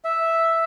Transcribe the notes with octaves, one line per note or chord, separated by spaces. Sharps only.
E5